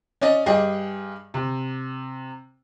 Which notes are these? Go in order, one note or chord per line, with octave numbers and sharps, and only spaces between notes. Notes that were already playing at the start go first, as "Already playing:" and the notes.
C#4 D5 D#5
G2 G4 G#4 D#5
C3